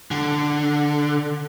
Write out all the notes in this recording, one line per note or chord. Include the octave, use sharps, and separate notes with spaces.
D3